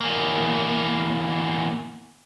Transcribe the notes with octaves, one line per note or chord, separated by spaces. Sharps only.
E2 A#3